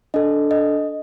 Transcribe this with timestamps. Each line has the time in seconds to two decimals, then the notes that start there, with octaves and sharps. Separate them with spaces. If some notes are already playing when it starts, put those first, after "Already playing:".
0.14 D4 A4 D#5
0.51 D#5